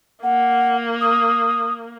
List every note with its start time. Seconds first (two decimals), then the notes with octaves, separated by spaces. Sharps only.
0.23 A#3 F#5
1.01 D#6